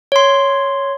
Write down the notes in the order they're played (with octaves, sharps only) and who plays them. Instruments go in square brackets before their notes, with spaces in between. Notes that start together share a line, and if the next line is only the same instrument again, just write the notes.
[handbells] C#5 C6